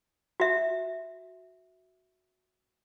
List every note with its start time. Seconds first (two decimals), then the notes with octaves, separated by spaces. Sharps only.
0.40 F#4 E5